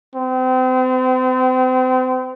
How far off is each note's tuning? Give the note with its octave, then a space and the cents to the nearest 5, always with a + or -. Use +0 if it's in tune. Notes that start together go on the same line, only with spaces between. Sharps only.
C4 -35